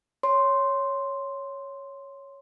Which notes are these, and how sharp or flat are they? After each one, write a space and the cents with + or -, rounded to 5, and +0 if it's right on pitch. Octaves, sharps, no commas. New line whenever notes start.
C#5 +0 C6 +0